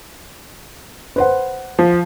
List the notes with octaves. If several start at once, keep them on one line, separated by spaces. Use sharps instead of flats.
B4 C5 F#5
F3